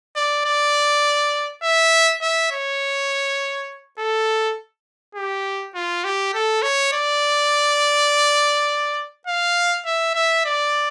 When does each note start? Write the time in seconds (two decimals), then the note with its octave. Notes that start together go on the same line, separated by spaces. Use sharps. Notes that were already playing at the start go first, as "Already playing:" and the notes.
0.16 D5
0.45 D5
1.63 E5
2.22 E5
2.52 C#5
3.99 A4
5.15 G4
5.75 F4
6.04 G4
6.34 A4
6.62 C#5
6.93 D5
9.27 F5
9.86 E5
10.15 E5
10.45 D5